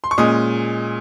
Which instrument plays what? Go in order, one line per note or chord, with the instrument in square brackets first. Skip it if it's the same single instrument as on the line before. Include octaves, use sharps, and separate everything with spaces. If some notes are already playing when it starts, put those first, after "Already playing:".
[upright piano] C6
C#6
A#2 G#3 C#4 D#6